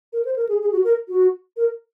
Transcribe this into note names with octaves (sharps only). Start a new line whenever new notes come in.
A#4
C5
A#4
G#4
G#4
F#4
A#4
F#4
A#4